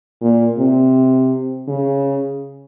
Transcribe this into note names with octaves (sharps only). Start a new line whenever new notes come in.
A#2
C3
C#3